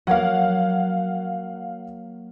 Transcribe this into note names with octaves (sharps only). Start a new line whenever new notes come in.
F#3 A#3 F5 F#5